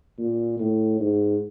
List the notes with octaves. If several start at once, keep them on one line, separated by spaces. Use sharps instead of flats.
A#2
A2
G#2